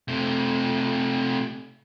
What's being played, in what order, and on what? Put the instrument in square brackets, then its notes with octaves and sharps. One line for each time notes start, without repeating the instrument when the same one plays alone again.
[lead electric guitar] C3 A3